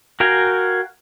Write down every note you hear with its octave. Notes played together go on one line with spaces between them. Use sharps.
F#4 A#4 F5 G5 G#5